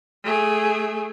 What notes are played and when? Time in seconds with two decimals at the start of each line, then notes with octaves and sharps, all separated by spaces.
0.24 A3 G#4